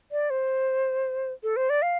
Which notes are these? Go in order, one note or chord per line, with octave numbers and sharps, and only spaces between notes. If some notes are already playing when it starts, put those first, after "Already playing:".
D5
C5
A4
C5
D5
F5